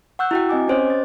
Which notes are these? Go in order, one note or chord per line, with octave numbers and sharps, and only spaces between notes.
F#5 C#6 E6 F#6 G6
E4 F#4 G5
C4 D#5 G#5 D6
C#4 G4 C5 C#5 D#5 D6
A6